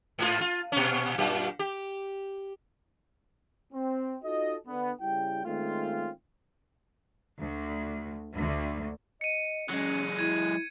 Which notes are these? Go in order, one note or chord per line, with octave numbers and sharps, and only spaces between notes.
G#2 F4
F4
A#2 C#4
F#2 A#2 G4
G4
C4
D#4 F4 F#4 A4 D#5
D3 B3
C#3 G3 E4 G5
D#3 G#3 A3 C4 C#4 F4
D2
D2
D#5 C#7 D#7
F#3 G#3 C#4
E4 G#6 D#7